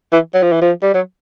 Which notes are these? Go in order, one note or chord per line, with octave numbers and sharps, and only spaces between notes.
E3
F#3
F3
E3
F3
G3
F#3